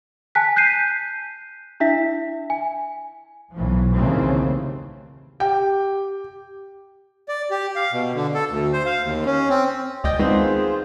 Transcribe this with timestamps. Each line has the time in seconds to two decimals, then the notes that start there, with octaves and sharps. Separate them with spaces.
0.35 G#5 A5 F#6 B6
0.56 F#6 G6 B6 C7 D#7
1.80 D4 E4 E5 B6
2.50 G#5
3.53 B1 E3 F3
3.94 D#2 A2 C#3 E3 A3 C4
5.40 G4 G5
7.28 D5
7.51 G4
7.76 F5
7.92 B2
8.15 D3
8.34 A4
8.50 D2
8.73 C5
8.86 F5
9.03 D#2
9.25 C#4
9.49 C4
10.04 D2 D5 D#5 G5
10.19 D#3 G#3 B3 C4 F4 G#4 C5